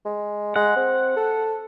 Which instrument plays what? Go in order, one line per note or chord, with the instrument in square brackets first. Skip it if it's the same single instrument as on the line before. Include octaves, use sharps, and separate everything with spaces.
[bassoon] G#3
[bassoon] G#3 [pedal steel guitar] F#5
[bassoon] C4
A4